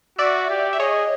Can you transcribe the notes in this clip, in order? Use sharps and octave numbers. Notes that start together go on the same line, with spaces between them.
F#4 D5 E5
G4
E5
G#4 C#5 D#5